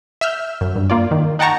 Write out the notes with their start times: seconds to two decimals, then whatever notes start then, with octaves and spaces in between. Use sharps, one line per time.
0.21 E5 E6 F6 G6
0.61 F#2
0.76 G2
0.90 A#3 F4 D5
1.11 D#3
1.39 D#4 F#5 G5 A5 A#5 C#6